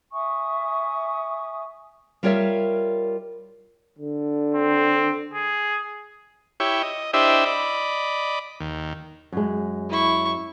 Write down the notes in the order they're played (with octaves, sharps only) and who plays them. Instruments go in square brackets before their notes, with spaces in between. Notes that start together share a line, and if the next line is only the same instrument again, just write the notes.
[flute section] E5 G#5 C#6 D#6
[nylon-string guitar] G3 F4 A#4 C#5 D5 E5
[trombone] D3
[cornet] C4
G#4
[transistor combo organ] E4 G4 C#5
D#5
D4 E4 G4 C5 D#5 E5
D5 D#5 B5
D#2
[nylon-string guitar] F#2 G#3
[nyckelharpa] E4 C#6